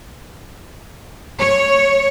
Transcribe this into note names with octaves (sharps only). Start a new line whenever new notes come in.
C#5